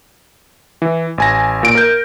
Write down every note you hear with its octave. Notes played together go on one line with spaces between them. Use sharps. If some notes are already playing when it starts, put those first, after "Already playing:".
E3
A1 G#5 A#6
A#2 D7
A#4 G6